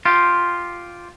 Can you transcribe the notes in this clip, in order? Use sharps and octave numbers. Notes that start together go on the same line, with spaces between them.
F4 G4